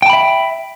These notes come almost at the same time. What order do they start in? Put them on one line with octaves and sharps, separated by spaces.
G5 A5 B5 E5